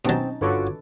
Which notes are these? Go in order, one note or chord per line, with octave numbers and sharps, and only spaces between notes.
B2 F#3 C4 C#4 D#4 A5
G1 D3 F4 F#4 A4 B4 C#5 D6